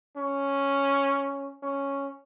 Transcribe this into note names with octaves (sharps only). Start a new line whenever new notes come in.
C#4
C#4